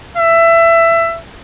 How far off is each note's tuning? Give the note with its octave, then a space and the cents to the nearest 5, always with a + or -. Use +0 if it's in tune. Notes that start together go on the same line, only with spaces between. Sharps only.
E5 +20